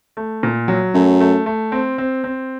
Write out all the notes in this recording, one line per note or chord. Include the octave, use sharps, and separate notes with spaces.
A3
A#2
F#3
F#2 A3
A3
A3
C4
C4
C4